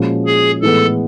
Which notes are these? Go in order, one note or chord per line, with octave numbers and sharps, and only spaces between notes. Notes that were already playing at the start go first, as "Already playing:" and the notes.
Already playing: A#2 F3 G#3 C#4 F#4
G#4
A2 E3 G#3 B3 A4